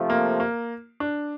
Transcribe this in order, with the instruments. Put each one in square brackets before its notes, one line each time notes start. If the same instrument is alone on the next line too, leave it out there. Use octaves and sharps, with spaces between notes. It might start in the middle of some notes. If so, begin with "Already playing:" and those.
Already playing: [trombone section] C3 F3 A3
[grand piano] A#3
A#3
D4